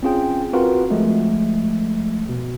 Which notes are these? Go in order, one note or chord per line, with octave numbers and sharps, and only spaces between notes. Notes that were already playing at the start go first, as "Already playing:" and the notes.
C4 C#4 F4 G#4 G5
C4 F4 F#4 A#4 B4 F#5
F3 G#3 A3
B2